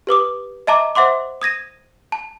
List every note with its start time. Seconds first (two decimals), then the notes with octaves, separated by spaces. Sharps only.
0.07 G4 B4 D6 D#6
0.67 D#5 E5 A5 A#5 D6
0.95 C5 E5 F#5 C6 D6
1.42 D#6 G#6 A#6 D#7
2.12 A5